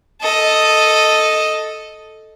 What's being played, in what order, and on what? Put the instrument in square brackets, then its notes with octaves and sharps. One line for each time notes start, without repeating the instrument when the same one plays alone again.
[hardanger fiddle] A4 D#5